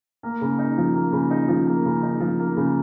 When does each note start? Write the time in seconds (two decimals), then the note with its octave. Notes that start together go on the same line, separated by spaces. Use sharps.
0.23 A#3
0.41 C#3
0.59 D#4
0.77 F3
0.95 A#3
1.13 C#3
1.30 D#4
1.48 F3
1.67 A#3
1.85 C#3
2.03 D#4
2.20 F3
2.39 A#3
2.57 C#3